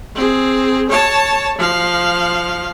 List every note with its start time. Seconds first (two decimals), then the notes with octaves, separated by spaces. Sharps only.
0.15 C4 G#4
0.90 C#5 A5
1.58 F3 F5